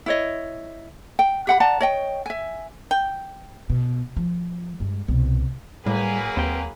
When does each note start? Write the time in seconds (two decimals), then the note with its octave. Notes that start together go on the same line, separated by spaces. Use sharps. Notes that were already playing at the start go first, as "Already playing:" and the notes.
0.06 E4 C#5 D#5
1.19 G5
1.47 G4 F#5 B5
1.60 D5 F#5 A5 A#5
1.81 C#5 D#5 G5
2.26 E5 G#5
2.91 G5
3.70 B2
4.17 F3
4.80 G2 G#3
5.08 C2 B2
5.86 A2 F#3 G3 A#3 G#4 B4
6.37 D#2 C4 G5